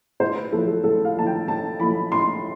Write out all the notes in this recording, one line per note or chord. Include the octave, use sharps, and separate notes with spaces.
A2 C5
B4
F3 A3 E4 A4
A4
A2 A4
F5
F3 A3 E4 A5
G5
A2 A5
F3 A3 E4 B5
A2 C6